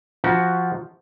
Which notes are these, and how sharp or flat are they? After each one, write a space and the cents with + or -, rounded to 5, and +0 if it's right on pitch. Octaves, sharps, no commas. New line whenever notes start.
F3 +0 F#4 +10 A#5 +40